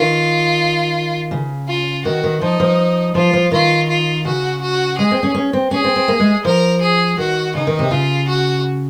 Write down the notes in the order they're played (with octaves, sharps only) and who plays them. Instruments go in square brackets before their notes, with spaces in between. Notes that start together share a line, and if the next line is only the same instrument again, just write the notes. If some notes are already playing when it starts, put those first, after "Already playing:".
Already playing: [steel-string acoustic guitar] D#3 [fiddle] F4
[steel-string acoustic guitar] C#3
[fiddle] F4
[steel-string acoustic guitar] D#3 [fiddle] F#4
[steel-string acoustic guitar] D#3
[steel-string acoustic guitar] F3 [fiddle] D#4
[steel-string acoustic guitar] F3
[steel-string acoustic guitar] F3 [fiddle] F4
[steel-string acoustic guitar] F3
[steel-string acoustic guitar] D#3 [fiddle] F4
[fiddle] F4
[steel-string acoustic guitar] C#3 [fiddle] F#4
[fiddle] F#4
[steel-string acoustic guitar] G#3 [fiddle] G#4
[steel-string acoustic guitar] C4
C#4
C#4
C4
[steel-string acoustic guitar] C#4 [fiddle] G#4
[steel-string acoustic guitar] C4
C4
A#3
G#3
[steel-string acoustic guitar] F3 [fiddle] A#4
[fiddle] G#4
[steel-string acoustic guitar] D#3 [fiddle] F#4
[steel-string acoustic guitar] C#3 [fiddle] D#4
[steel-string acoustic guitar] D#3
C3
[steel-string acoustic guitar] C#3 [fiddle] F4
[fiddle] F#4